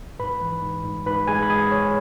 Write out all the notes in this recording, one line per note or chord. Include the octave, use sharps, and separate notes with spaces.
G#2 B4 B5
E3
G#2
G#2
G#2 B4 B5
G#3 G#4 G#5
B5
G#3 G#4 G#5
G#3 C#5